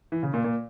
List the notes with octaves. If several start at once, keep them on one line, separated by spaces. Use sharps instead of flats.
E3
C#3
A#2
A#2